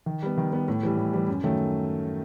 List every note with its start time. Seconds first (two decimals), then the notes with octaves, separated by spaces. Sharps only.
0.06 D#3
0.22 G3 B3
0.37 D#3
0.53 G3 B3
0.68 A2
0.83 E3 G3
0.97 A2
1.13 E3 G3
1.28 F#2
1.44 D#3 F#3 A3